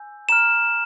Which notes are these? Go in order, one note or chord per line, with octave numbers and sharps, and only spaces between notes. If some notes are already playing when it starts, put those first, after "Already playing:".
Already playing: G#5 E6 G6
A#5 F6 E7